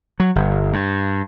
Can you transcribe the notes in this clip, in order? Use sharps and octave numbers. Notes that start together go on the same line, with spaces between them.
F#3
G1
G2